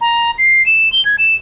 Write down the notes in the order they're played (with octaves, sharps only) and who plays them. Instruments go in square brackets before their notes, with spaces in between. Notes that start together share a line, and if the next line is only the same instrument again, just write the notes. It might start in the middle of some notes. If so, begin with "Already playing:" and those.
[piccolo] A#5
C7
E7
G7
G#6
E7